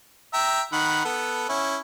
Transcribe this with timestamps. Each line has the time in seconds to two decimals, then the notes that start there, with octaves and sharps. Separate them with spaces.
0.34 E5 G5 A#5
0.73 D#3 F#5 B5
1.05 B3 A4
1.49 C#4 E4